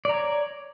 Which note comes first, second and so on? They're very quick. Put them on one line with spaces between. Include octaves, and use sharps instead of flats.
D5 A#5 C#5